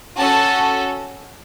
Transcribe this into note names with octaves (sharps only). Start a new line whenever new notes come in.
C#4 F#4 A4 A5